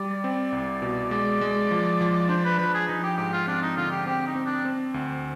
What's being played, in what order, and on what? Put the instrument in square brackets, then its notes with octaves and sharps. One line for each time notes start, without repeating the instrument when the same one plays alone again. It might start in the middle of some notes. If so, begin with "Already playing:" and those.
Already playing: [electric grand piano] G3 [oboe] D5
[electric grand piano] C4
C2
B2
[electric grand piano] G#3 [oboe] D5
[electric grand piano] G#3
F3
F3
[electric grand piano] D4 [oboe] C5
[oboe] B4
[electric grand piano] F3 [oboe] B4
[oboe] G#4
[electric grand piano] F3 [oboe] D#4
[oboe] G4
[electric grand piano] G#2 [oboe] G4
[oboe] F4
[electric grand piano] C4 [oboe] D4
[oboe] D#4
[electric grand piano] D3 [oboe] F4
[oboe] G4
[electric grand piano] C4 [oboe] G4
[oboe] D#4
[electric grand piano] C4
[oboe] D4
[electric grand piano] C4
D2